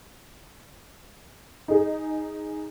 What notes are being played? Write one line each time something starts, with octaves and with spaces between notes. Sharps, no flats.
D#4 G#4